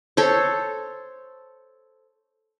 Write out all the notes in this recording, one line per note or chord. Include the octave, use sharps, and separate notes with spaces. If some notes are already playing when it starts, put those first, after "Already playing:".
A4 C5 C#5